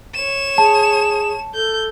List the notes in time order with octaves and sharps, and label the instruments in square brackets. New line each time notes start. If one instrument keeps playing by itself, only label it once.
[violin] C#5 E7
[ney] G#4 [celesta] A5
[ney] A4 [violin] G6